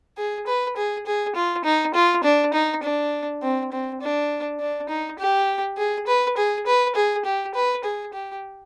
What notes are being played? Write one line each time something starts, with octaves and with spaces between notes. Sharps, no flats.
G#4
B4
G#4
G#4
F4
D#4
F4
D4
D#4
D4
C4
C4
D4
D4
D#4
G4
G#4
B4
G#4
B4
G#4
G4
B4
G#4
G4